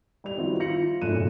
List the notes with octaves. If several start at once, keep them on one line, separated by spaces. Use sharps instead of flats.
G3 D5 F7
D#3 F3 G3 C4 E4 F#4
E4 F4 A#6 C#7 F#7
F4
F#2 A3 D4 F#6 D#7 E7
C#2 A#2